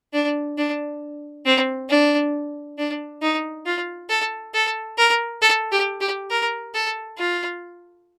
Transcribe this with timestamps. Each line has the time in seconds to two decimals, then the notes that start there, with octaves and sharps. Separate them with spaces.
0.13 D4
0.58 D4
1.46 C4
1.90 D4
2.78 D4
3.22 D#4
3.66 F4
4.09 A4
4.54 A4
4.98 A#4
5.42 A4
5.72 G4
6.01 G4
6.31 A#4
6.75 A4
7.18 F4